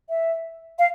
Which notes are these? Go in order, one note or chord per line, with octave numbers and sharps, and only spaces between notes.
E5
F5